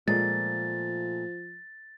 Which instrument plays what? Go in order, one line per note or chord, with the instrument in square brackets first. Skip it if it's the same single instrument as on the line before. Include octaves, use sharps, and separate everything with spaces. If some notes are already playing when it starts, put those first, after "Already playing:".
[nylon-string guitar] A#2 A3 D5 [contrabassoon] F3 [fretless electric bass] G#3 [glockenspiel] A6